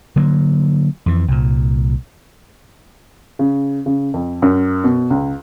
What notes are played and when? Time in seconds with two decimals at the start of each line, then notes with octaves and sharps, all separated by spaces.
0.16 D3 F#3 A#3
1.06 F2 E3
1.28 C2 A#2
3.39 C#3
3.86 C#3
4.14 F2
4.42 F#2
4.84 B2
5.10 C#2